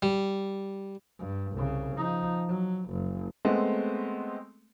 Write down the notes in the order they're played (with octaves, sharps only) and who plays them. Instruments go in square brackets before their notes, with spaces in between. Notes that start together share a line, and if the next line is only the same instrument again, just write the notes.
[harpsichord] G3
[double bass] G2
C2 C#3
F3 D#4
F#3
F#1
[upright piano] G#3 A3 B3 C4